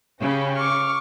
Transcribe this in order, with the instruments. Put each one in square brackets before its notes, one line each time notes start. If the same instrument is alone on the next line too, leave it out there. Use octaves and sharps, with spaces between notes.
[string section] C#3 [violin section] C#4 G4 B5
[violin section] C#6 [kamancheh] D6 F6